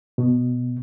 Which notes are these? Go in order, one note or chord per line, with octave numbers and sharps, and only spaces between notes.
B2